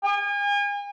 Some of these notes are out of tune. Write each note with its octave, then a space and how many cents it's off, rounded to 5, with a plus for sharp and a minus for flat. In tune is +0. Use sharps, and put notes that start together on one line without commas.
G#5 -40